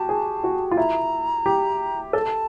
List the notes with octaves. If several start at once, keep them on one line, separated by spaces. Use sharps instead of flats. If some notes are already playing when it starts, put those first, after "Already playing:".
Already playing: F#4 G4 A5
G#4
F#4
F4
E4 A#5
G4
A4 A5